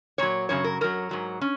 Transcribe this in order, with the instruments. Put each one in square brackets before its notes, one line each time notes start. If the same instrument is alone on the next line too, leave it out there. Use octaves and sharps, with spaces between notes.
[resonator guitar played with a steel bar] A#2 F#3 C#5
F#2 C#3 F#3 C#5
A#4
F#2 F#3 A#4
G#2 F#3
C#4